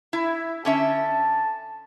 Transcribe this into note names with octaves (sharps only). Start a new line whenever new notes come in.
E4
D3 C#4 E5 A5